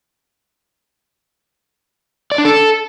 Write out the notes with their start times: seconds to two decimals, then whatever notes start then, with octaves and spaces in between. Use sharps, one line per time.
2.32 D5
2.38 D4
2.45 A4